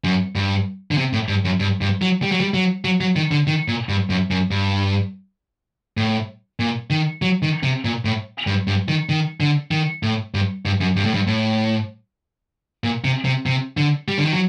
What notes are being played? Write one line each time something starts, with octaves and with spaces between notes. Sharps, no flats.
F#2
G2
D3
C3
A2
G2
F#2
G2
G2
F#3
G3
F#3
G3
F#3
F#3
F#3
D#3
D3
D#3
A#2
G2
F#2
F#2
G2
A2
A#2
D#3
F#3
D#3
C3
A#2
A2
G2
G2
D#3
D#3
D3
D#3
A2
G2
G2
F#2
G2
A2
G2
A2
A#2
C3
C3
C3
D3
G3
D3
D#3
F#3